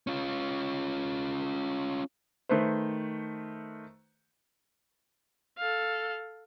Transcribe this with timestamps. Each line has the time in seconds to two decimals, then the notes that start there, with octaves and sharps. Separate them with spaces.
0.07 C#4 F4
2.49 D#3 A3 B4 C5
5.58 A4 F5